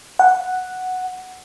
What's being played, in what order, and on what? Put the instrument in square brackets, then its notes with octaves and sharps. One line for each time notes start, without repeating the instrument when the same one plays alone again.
[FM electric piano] F#5